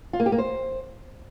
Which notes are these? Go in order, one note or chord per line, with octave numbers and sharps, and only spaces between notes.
F4
A#3
G4
A#3
C5